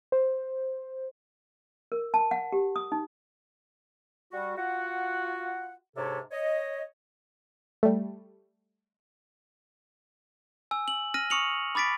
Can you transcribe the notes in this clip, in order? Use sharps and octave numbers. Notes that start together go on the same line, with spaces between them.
C5
A#4
A5
F#5
G4
D#6
D#4
G3 F#4
F4 F#4 F#5
G#2 C3 D4 A4 C#5
C#5 D#5
G3 A3
G#5 E6
F#7
F6 A#6 D#7
C#6 D#6 C#7 F7 F#7
B5 D6 A6 B6 D7